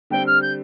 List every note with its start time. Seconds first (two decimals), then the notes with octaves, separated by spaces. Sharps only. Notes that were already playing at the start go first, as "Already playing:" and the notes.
0.10 D3 G3 C4 G5
0.27 F6
0.42 G6